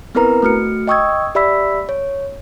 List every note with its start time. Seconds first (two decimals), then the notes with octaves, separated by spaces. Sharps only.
0.15 B3 C4 E4 A#4 B4 A#5
0.42 A3 F#4 F6 C#7
0.88 D#5 G5 C#6 D#6 E6 G#6
1.35 G4 D5 E5 B5 E6 B6
1.89 C#5